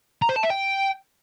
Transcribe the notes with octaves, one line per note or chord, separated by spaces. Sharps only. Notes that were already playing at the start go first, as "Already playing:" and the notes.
A#5
C5
A5
E5
G5